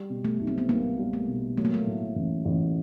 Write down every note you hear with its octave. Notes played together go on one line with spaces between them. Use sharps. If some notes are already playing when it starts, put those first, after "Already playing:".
Already playing: G3
B2
A3
B1
C4
B3
B1 A#3
G3
A3
B2
F#3 A3
A#3
A3
A2
A1
A1